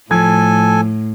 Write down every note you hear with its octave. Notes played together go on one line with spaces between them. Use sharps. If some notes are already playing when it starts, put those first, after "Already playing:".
A2 F3 A4 G#5 G#6